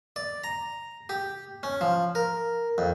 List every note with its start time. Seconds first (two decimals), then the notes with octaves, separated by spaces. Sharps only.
0.16 D5
0.44 A#5
1.09 G4
1.63 C#4
1.81 F3
2.15 A#4
2.78 F2